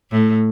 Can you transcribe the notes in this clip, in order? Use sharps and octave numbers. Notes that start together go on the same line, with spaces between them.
A2